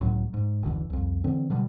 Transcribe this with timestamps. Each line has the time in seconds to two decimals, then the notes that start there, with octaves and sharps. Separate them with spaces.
0.01 C#2 A2 F#3
0.34 G#2
0.63 F#1 D2 D3 E3
0.90 C2 F2
1.24 D3 E3 C4
1.50 B2 D3 F#3 G3